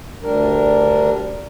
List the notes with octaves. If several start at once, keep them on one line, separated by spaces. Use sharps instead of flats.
D2 G3 D4 A#4